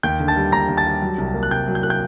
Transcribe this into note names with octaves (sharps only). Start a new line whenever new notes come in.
D#2 G5 G6
D3
A5 A6
G3
D#2 A#5 A#6
D#2
A5 A6
G3
F#3
C2
A#3
F#6
C2 G5 G6
F#3
G6
A#3 F#6
G5 G6